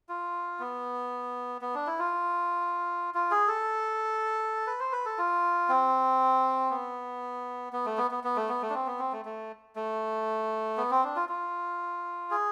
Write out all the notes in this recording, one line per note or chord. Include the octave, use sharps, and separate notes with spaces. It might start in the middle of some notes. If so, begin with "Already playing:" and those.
F4
B3
B3
D4
E4
F4
F4
G#4
A4
B4
C5
B4
A4
F4
C4
B3
B3
A3
B3
B3
B3
A3
B3
A3
D4
C4
B3
C4
A3
A3
A3
B3
C4
D4
F4
F4
G#4